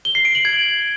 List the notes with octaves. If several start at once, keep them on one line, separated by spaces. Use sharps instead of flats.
G7
C7
D7
F#7
G#6